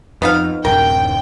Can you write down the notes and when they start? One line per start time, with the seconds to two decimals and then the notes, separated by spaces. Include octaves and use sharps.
0.22 F2 B3 D#4 F5
0.65 D1 F#2 C3 A#4 G5